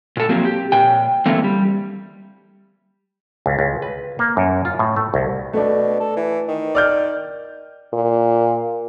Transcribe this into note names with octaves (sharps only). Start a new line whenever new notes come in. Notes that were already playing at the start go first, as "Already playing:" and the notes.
A#2 A4
F3 F#3 A#3 C4
G4
A#2 G5
D3 E3 A3 A#3 C4
G3
C#2
C#2
B4
A#3
F#2
F4
A2
A3
C2
B2 A3 D4
A4
E3
D#3
D5 F6 G6
A#2